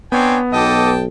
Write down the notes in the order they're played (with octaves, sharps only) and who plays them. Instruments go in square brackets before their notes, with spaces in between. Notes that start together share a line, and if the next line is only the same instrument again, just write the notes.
[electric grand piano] B3 [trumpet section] C4 D4 C#5 [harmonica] G5 G#5
[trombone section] B1 [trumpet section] A4 D#5 D6 [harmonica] G5 A5